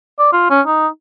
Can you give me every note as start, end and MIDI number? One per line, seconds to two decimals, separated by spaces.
0.19 0.31 74
0.33 0.47 65
0.50 0.61 61
0.66 0.87 63